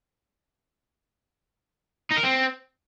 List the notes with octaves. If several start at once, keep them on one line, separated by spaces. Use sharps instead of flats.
D#4
A#4
C4